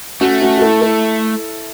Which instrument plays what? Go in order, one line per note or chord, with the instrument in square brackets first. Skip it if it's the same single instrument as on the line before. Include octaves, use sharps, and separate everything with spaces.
[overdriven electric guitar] A3 [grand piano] C#4 F#4
[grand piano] C#4 F#4
F#4
E4 A4
E4 A4